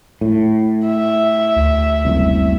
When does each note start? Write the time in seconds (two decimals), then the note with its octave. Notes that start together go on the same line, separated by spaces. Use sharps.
0.21 A2
0.87 E5
1.56 D2
2.05 F#1 C2